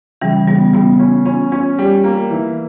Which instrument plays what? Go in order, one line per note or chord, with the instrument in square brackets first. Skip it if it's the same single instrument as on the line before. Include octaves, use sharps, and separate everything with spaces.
[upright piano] C#3 [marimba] E3 G3
[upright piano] C#3 [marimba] G3 B3
[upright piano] C#3 [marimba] G3 B3
[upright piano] C#4
C#4
C#4
G3
A#3
E3